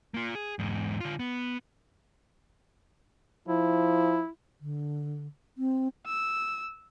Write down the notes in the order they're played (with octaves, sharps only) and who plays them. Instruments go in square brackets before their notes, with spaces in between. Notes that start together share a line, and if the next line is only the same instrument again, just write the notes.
[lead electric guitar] A#3 F4
G#4
E2 G#2
D3 F4
B3
[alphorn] F3 [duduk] E4
[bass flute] D3
C4
[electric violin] E6